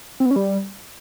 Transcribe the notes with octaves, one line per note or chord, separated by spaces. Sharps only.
C4
B3
C#4
G3